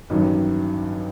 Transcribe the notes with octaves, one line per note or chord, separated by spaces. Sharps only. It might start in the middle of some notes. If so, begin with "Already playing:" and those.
A1 G2 D#3 F#3